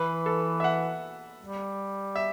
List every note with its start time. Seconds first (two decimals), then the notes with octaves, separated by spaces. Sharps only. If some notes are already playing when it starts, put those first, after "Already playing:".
Already playing: E3 B4
0.26 A4
0.60 E5
0.64 F#5
1.40 G3
2.16 E5